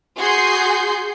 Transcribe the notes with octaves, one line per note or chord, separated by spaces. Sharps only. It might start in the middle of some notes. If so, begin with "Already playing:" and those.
F#4 G#4 C6 G6 C7